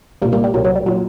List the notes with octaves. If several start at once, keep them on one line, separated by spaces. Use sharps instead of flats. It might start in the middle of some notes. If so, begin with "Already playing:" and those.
C2 A#2 G3 A#3
G3 A#3
G3
C2 A#2 F#3
F#3
G3
A#2 F#3